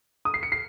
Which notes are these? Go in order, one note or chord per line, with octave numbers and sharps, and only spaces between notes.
D#6
C7
C#7
C7